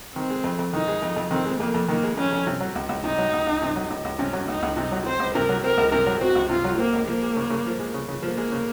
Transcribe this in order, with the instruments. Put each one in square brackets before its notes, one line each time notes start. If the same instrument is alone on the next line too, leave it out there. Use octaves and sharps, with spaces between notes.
[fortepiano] D#3 [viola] C4
[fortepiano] G#3
F2
F2
[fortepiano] D#3 [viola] D#4
[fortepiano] G#3
F2
F2
[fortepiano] D#3 [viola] C4
[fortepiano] G#3
[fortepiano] F2 [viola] A#3
[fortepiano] F2
[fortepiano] D#3 [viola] A#3
[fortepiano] G#3
[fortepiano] F2 [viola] C#4
[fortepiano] F2
C3
F#3
C#2
C#2
[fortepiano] C3 [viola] D#4
[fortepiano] F#3
C#2
C#2
C3
F#3
C#2
C#2
[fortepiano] C3 [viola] C#4
[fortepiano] F#3
[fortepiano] C#2 [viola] D#4
[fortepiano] C#2
[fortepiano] C3 [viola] D#4
[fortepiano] F#3
[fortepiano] C4 [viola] C5
[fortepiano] C#2
[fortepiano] C3 [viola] A#4
[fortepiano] F#3
[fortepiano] C4 [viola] A#4
[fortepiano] C#2
[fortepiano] C3 [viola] A#4
[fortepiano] F#3
[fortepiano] C4 [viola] F#4
[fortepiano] C#2
[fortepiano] C3 [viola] F4
[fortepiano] F#3
[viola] A#3 [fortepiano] C4
[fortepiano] C#2
[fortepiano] F3 [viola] A#3
[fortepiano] G#3
C#3
C#3
F3
G#3
C#3
C#3
[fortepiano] F3 [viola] A#3
[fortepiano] G#3
C#3